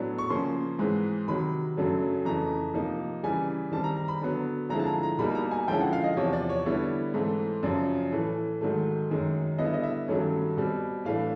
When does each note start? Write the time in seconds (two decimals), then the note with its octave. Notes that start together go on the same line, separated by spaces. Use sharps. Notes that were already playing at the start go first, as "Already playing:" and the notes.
Already playing: A2 F#3 B3 D4
0.18 C#6
0.30 C#3 F3 A#3 C#4 C6
0.79 G#2 E3 G#3 C4
1.28 C3 D#3 F#3 B5
1.77 F#2 C#3 F#3 A3 D4
2.25 F2 C#3 E3 A3 A#5
2.74 C3 F3 A#3 D#4
3.24 C#3 E3 G3 G#5
3.72 D#3 G3 C4 A5
3.84 A#5
3.96 A#5
4.08 B5
4.21 D3 F#3 B3
4.69 D3 F3 G#3 C4 E4 A#5
4.79 A5
4.87 A#5
5.03 A#5
5.18 B2 G3 A#3 D#4 B5
5.35 A#5
5.51 G#5
5.68 D3 F3 G#3 C#4 E4 G5
5.80 F#5
5.93 F5
6.04 D#5
6.16 E2 C3 F3 C#5
6.33 D5
6.49 C#5
6.65 D3 G3 B3 E4 C#5
7.14 G#2 E3 A3 C4
7.63 F#2 C#3 F3 D5
8.12 A2 E3 A3
8.61 G#2 D#3 F#3 A3
9.10 F#2 D#3 G#3
9.58 D3 G3 B3 E4 D#5
9.66 E5
9.74 D#5
9.83 E5
10.08 G2 D#3 F#3 A3 C#4
10.57 B2 G3 C4
11.05 A2 E3 A3 D4 F5